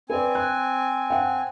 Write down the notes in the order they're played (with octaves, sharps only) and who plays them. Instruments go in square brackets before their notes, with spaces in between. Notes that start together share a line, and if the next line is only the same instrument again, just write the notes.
[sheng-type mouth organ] C4 G#5 [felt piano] B4 D5
[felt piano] F#6
F#5 G5